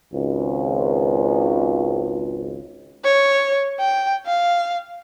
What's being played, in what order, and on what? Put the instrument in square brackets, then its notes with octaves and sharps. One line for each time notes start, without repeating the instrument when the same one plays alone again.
[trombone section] G#1 C#2
[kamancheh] C#5
G5
F5